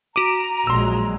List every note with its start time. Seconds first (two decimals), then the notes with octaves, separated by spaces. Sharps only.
0.16 F#4 A#5 D6 D7 D#7
0.67 A#1 F#3 G#3 C6 E6